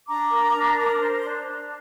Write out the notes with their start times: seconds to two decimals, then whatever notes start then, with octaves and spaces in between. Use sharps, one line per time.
0.08 D4 A#5 D6
0.31 A#4
0.54 D4
0.78 A#4
1.01 C5
1.24 D4
1.47 D4